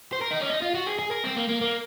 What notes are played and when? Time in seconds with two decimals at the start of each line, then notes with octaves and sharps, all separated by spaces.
0.12 C5
0.21 A#4
0.31 D#4
0.40 C#4
0.50 D#4
0.62 F4
0.74 F#4
0.86 G#4
0.99 G#4
1.11 A#4
1.24 C4
1.36 A#3
1.49 A#3
1.61 A#3